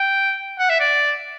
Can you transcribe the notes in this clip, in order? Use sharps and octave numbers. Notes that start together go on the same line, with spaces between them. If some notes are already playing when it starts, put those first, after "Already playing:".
Already playing: G5
F#5
E5
D5